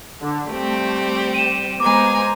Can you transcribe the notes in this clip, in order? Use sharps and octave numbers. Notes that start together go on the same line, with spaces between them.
D3
G3 A3 C4 G4
D#7 E7
G#3 B3 C5 G#5 A#5 D6